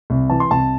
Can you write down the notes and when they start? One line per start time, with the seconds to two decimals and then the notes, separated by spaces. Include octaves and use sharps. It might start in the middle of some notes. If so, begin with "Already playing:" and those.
0.10 C2
0.30 E3 A5
0.40 C6
0.51 C2 A5